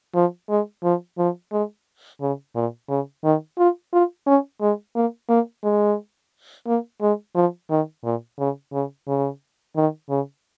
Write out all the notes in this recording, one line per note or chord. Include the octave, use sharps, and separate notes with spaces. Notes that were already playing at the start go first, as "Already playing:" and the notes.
F3
G#3
F3
F3
G#3
C#3
A#2
C#3
D#3
F4
F4
C#4
G#3
A#3
A#3
G#3
A#3
G#3
F3
D#3
A#2
C#3
C#3
C#3
D#3
C#3